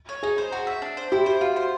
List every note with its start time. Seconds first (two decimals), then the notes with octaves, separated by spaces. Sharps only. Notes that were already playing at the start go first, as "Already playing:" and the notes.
0.09 C#5
0.23 D#4 G#4
0.38 C5
0.52 F#4
0.67 E5
0.82 D4
0.97 C5
1.12 E4 G4
1.26 C5
1.41 F4 F#4
1.56 C5